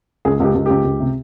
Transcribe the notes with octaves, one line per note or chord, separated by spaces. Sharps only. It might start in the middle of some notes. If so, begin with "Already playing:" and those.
C#2 G#4
C#2 G4
C#2
C#2 G4
C#2
C3